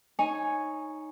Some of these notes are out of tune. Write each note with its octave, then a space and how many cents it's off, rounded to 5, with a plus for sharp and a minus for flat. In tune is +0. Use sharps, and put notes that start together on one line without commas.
D#4 +0 C#5 +0 G#5 +0